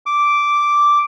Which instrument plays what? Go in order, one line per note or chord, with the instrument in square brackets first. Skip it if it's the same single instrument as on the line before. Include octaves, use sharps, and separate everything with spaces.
[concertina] D6